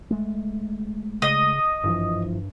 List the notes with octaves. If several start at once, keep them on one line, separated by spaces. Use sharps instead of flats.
G#3 A3
C#3 D#5
G#1 G2 E3 F3